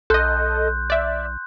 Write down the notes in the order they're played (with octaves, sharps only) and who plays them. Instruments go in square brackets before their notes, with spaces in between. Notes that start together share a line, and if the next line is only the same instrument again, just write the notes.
[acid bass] B1 [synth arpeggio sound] A4 D#5 [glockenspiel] C6 F#6 G6
[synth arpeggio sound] D5 E5